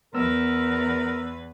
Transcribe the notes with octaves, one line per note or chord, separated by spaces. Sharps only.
E2 B3 A#4 B4 E6